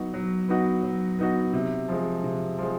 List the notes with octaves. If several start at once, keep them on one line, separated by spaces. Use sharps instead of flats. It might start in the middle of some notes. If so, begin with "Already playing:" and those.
Already playing: F#3 B3 D#4 F#4
F#3
B3 D#4 F#4
F#3
B3 D#4 F#4
C3
F3 G#3
C3
F3 G#3